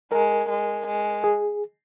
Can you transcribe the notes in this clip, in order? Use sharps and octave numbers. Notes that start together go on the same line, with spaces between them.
G#3 A#4
G#3
G#3
G#4